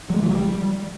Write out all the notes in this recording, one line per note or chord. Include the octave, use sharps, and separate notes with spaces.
F#3
G#3
E3
F#3
G3